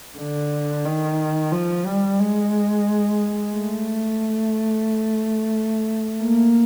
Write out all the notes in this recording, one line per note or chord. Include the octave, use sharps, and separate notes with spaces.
D3
D#3
F3
G3
G#3
A3
A#3